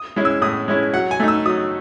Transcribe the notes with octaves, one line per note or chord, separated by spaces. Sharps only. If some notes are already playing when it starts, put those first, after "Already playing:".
Already playing: D#6
G#3 C#4 E4
E6
A2 D#6
G#3 C#4 E4
F#3 F#5
G#5
A3 D#4
E6
F#3 D#6